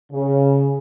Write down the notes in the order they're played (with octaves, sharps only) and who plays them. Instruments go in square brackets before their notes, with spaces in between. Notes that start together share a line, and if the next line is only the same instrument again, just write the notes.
[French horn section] C#3